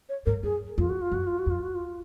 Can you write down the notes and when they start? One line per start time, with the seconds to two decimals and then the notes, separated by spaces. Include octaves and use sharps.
0.09 C#5
0.26 G#2 A#4
0.43 F#2 G#4
0.78 F2 F4
0.89 F#4
1.01 F4
1.12 F#2 F#4
1.26 F4
1.39 F#4
1.46 F2 F4
1.62 F#4
1.75 F4